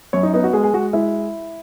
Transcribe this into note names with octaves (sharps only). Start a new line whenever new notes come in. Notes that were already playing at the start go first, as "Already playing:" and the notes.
F#2 C#5
D#4
B3 D#4
F#4
G#3 G#4
G#4
G#3 F#4
G#3 E4